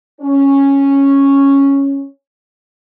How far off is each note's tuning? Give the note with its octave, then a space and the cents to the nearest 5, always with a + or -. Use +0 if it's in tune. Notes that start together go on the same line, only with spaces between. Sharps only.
C#4 -5